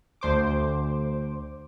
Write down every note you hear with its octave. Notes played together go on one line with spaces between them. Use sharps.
D2 C5 D6